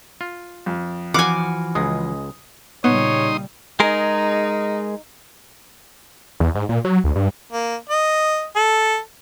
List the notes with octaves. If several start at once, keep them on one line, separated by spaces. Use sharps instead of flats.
F4
F2
E3 F3 F#4 F5 F#5 G#5 D6
C#2 G#3 D#6
A#2 C#3 G3 B3 D#4 C#5 C6 D#6
G#3 D#4 G#4 A#4
E2
G#2
A#2
F#3
D2
G2
A#3
D#5
A4